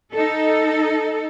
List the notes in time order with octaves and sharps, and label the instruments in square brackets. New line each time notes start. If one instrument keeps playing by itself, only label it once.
[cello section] D#4 A4